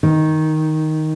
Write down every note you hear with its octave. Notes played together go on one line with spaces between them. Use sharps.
D#3